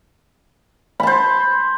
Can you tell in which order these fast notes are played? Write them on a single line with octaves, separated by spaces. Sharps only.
B5 A5 C5